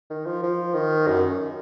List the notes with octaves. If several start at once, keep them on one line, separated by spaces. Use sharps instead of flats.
D#3
F3
F3
D#3
F#2